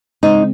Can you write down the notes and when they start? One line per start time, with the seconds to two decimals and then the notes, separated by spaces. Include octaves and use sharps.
0.23 C#3 G#3 C4 D#4